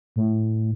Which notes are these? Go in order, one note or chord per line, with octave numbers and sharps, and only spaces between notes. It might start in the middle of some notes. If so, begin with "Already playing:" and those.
A2